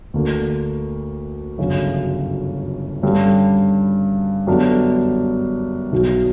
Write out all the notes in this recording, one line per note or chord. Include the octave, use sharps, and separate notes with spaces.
D2 D3 A#3
G1 F#2 C#3
G2 D3 G3 C#4
F#2 D3 G3 B3 D4
B1 B2 F#3